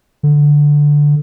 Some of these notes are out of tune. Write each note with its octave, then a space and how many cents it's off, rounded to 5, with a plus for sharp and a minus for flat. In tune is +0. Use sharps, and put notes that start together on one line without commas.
D3 +0